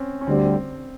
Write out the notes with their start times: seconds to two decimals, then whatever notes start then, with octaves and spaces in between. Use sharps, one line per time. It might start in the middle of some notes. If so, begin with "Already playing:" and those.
Already playing: C4 C#4
0.21 C#4
0.27 D2 D3 G3 C4